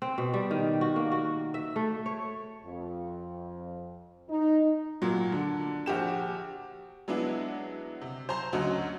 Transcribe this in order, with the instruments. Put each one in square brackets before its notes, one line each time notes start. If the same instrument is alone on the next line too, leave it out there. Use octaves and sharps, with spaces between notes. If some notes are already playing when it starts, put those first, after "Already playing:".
[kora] C4
B2
G3
D#3
F#4
A#3
F#4
E5
A3
C#5
[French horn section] F2
D#4
[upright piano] A#2 F#3
D3
A#1 F#4 G4 E7
[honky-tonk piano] F#3 G#3 B3 D4 E4
C3
C5 A5 A#5 C6
D2 F#3 C#4 F#4 D#5